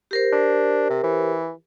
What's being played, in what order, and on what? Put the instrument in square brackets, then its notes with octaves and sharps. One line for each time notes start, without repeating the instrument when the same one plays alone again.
[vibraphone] G4 A#4 C5
[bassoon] D4
C3
E3